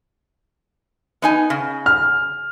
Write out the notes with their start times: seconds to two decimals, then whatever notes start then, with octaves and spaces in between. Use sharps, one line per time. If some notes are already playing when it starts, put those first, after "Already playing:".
1.22 B3 D#4 G#5
1.50 C#3
1.86 F6